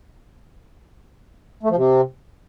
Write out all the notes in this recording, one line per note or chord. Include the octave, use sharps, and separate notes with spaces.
A3
F3
C3